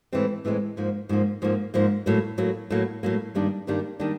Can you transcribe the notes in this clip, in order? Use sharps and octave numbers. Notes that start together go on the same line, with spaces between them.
A2 E3 G#3 C4
A2 E3 G#3 C4
G#2 F3 A#3
G#2 F3 A#3
G#2 F3 A#3
G#2 F3 A#3
A2 F#3 A#3
A2 F#3 A#3
A2 F#3 A#3
A2 F#3 A#3
G2 D#3 G3 A#3 D4
G2 D#3 G3 A#3 D4
D#3 G3 A#3 D4